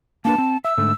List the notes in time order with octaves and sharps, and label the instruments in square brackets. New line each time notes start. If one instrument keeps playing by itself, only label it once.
[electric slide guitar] A#3 D4 B4 [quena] A5
[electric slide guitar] C4
[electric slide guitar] E5 [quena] E6
[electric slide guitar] G#2 D3 A3